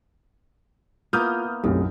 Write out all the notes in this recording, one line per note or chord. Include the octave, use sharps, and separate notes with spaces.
A#3 B3 E4 F4 D#6 F6 G6
B1 F#2 A2 A3 C4 G4